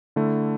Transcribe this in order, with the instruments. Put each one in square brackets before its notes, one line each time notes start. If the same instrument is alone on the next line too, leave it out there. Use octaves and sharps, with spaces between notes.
[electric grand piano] D3 A3 E4